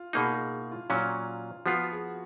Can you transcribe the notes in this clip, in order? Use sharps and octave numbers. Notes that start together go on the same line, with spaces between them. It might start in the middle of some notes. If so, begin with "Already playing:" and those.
Already playing: F4
B2 A#3 D#4 G#4
G#4
F4
A#2 F#3 C#4 F4
F3 B3 F4 F#4
G#4